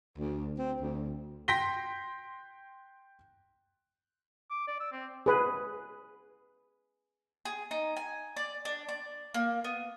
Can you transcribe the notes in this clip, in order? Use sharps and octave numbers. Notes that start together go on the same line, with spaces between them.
D2
C4
D2
G5 C6 A#6 B6 G7
D6
D5
E6
C4
G#4 B4
G#4
D#4
G#5
D5
D4
D5
A#3
B3